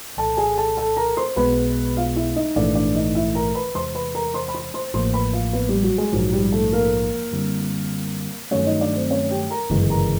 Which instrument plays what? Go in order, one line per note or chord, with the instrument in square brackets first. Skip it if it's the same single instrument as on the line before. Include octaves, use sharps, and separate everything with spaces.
[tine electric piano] C2 A#2 F3 [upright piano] A4 A5
[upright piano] G#4 G#5
A4 A5
A4 A5
A#4 A#5
C5 C6
[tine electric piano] B1 B2 G#3 B3 [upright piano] B4 B5
[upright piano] F4 F5
E4 E5
D#4 D#5
[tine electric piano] A#1 G#2 E3 A3 [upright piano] D4 D5
[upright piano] D4 D5
D#4 D#5
E4 E5
A#4 A#5
B4 B5
[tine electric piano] E2 C3 E3 G#3 [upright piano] C5 C6
[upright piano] B4 B5
A#4 A#5
C5 C6
B5
C5 C6
C5 C6
[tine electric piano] A1 A2 F3 A#3 [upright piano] C5 C6
[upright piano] B4 B5
F4 F5
B3 B4
G3 G4
F#3 F#4
G#3 G#4
[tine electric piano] A#1 G#2 F3 [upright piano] F#3 F#4
[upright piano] G3 G4
A3 A4
A#3 A#4
[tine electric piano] F#2 D3 G3 C4 E4
[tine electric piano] G2 D#3 F#3 A3 [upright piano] C#4 C#5
[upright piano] D#4 D#5
D4 D5
C4 C5
C#4 C#5
G4 G5
A#4 A#5
[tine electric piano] G1 F#2 C#3 E3 G#3
[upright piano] A#4 A#5